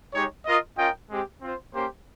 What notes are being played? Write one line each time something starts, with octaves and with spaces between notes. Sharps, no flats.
G#3 D#4 G4 C#5
F4 A#4 D#5
C#4 F4 A#4 D#5 G5
G#3 C4 G4
C4 F4 C5
A#3 C#4 G4 C5